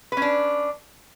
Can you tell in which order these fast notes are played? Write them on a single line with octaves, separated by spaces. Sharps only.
B4 C#4 D4